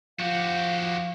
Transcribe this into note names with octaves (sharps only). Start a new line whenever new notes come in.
F3 F#4 G4 F5